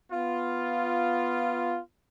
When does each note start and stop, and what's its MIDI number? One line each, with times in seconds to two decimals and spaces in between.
0.12 1.79 59
0.12 1.79 65